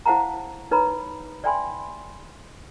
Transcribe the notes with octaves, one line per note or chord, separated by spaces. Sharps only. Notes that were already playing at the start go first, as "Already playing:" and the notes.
E4 C5 F5 F#5 A5 A#5
D#4 B4 C#5 A#5 B5
D5 E5 G5 G#5 B5 C6